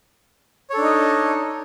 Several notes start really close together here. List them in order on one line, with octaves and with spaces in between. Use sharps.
C#5 A4 D4 D#4 D#5